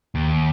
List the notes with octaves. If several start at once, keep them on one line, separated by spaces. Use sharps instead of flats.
D#2